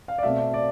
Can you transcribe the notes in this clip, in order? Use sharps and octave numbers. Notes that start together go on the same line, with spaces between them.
F5
D5
B2 A3 C4 E5
D5